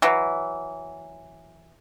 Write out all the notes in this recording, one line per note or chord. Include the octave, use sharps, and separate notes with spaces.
E3 F#3